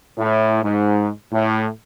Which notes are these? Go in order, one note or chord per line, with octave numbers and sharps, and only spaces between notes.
A2
G#2
A2